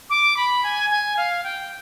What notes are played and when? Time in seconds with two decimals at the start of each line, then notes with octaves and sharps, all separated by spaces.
0.10 D6
0.37 B5
0.63 G#5
0.90 G#5
1.17 F5
1.44 G5